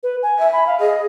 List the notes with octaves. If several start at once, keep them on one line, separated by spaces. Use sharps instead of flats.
B4
G#5
E5
B5
F5
G#4 D#5